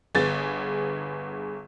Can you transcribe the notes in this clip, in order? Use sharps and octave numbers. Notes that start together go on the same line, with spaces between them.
G1 B3 G#4 A6